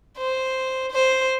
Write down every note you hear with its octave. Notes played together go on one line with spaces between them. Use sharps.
C5
C5